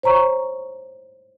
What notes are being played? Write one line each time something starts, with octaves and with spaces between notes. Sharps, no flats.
C5 C#5 A#5 C#6